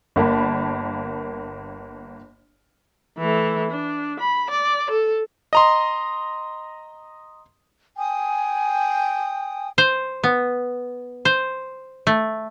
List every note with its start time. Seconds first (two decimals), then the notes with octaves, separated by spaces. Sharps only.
0.16 G1 A#3 A5 B5
3.18 E3 A3
3.71 D4
4.20 B5
4.50 D5
4.90 A4
5.53 D#5 A#5 C6
7.97 G5 G#5 D#6
9.78 C5
10.24 B3
11.25 C5
12.07 A3